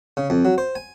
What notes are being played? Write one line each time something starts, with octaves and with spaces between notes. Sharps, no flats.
C#3
F2
F#3
C5
G#5